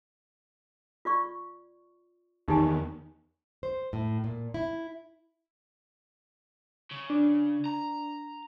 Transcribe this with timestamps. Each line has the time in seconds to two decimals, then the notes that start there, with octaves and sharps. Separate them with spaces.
1.05 F4 D5 C#6
2.48 E2 D#3 D#4 G4 G#5
3.63 C5
3.93 A2
4.24 A#2
4.54 E4
6.92 C#3
7.10 D4
7.65 A#5